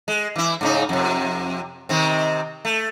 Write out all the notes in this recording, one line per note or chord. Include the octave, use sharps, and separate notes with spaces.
G#3
E3 E4
G#2 C#3 D#4
F2 C3
C3 D#3 C4
A3